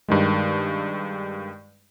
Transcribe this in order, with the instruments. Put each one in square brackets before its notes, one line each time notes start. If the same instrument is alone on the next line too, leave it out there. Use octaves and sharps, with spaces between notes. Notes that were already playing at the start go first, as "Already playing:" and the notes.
[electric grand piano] G2 D#3 G#3